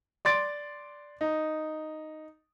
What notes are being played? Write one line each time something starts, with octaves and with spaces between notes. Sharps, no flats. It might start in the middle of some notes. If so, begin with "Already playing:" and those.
D5 C6 A6 D7
D#4